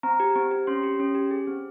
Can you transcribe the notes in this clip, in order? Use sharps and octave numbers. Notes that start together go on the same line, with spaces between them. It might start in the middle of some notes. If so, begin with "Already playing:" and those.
C4 A#5
G4
C4
G4
C#4 C6
G4
C#4
G4
G#4
C4